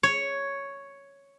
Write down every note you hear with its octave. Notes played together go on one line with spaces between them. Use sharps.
C#5